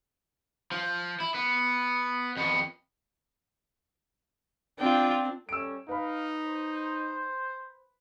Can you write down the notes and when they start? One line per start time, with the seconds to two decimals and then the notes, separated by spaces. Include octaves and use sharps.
0.72 F3
1.20 E4
1.35 B3
2.37 F2 B3
4.79 C4 D4 F4 G5
5.49 G3 C#4 A4 E6 D7
5.89 D#4 B4 F5 B5
6.44 C5